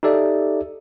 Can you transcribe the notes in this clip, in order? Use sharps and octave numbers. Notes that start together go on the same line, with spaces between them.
D#4 G4 A4 D5 E5